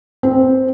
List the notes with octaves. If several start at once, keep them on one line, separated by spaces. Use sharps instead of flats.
C4